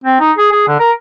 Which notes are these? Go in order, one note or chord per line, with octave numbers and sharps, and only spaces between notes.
C4
D#4
G#4
G#4
D3
A#4